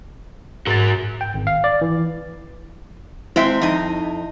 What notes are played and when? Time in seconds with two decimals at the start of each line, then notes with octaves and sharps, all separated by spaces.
0.67 G#2 F#4 A#4 A6
1.21 G5
1.34 G#1
1.47 F5
1.64 D5
1.81 E3
3.36 G#3 C4 E4 E5
3.62 F2 D#4